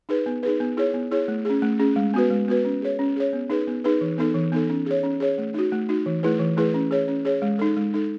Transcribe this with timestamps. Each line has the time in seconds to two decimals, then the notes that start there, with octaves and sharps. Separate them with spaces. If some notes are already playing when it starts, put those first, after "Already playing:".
0.09 D#4 G#4 B4
0.26 B3
0.43 D#4 G#4 B4
0.60 B3
0.77 E4 G#4 C#5
0.94 B3
1.11 E4 G#4 C#5
1.28 A3
1.45 C#4 G#4
1.62 A3
1.80 C#4 G#4
1.96 G#3
2.14 B3 F#4 B4
2.31 G#3
2.48 B3 F#4 B4
2.65 C#4
2.82 G#4 C#5
2.99 C#4
3.16 G#4 C#5
3.33 B3
3.50 D#4 G#4 B4
3.67 B3
3.84 D#4 G#4 B4
4.01 E3
4.18 B3 D#4 A4
4.35 E3
4.52 B3 D#4 A4
4.69 C#4
4.86 G#4 C#5
5.04 C#4
5.20 G#4 C#5
5.38 A3
5.54 D#4 F#4
5.72 A3
5.89 D#4 F#4
6.06 E3
6.23 A3 E4 G#4 B4
6.39 E3
6.57 A3 E4 G#4 B4
6.74 C#4
6.91 G#4 C#5
7.08 C#4
7.25 G#4 C#5
7.42 G#3
7.59 D#4 A4
7.76 G#3
7.94 D#4 A4